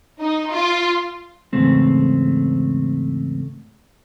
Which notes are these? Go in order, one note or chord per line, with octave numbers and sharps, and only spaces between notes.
D#4
F4
E2 G#2 C#3 A3 C4